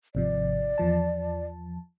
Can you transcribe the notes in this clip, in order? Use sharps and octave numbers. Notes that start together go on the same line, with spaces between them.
G#1 C3 F3 D5
E2 F3 A5